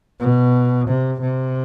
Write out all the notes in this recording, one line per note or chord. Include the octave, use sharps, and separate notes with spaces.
B2
C3
C3